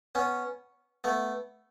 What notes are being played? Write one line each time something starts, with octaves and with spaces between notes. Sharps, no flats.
B3 C#4
A3 B3